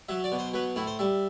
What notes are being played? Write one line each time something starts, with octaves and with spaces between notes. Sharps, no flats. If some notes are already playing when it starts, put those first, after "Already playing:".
F#3 E5
D5
B2
C5
F#3 B4
A2 E4
C5
G3 E5